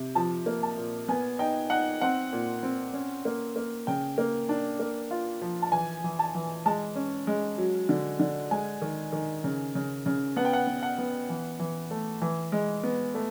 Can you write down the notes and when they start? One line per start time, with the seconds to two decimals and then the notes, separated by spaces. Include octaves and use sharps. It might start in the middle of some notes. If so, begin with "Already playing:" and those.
Already playing: C3
0.15 F3 A5
0.46 A#3
0.63 A5
0.78 A#2
1.08 B3 G#5
1.39 D#4 G5
1.70 D#4 F#5
2.01 C4 F#5
2.33 A#2
2.63 C4
2.94 C#4
3.25 A#3
3.56 A#3
3.87 C#3 G5
4.18 A#3
4.49 D4
4.79 A#3
5.11 F4
5.42 F3
5.62 A5
5.72 E3 G#5
6.04 E3
6.19 A5
6.35 E3
6.66 G#3 A5
6.96 C#4
7.27 G#3
7.58 F#3
7.89 D3
8.19 D3
8.51 G#3 G#5
8.82 D#3
9.13 D#3
9.44 C#3
9.75 C#3
10.06 C#3
10.36 B3 F#5
10.45 G5
10.53 F#5
10.67 B3
10.83 F#5
10.98 B3
11.29 E3
11.59 E3
11.91 A3
12.22 E3
12.52 G#3
12.83 B3
13.15 A3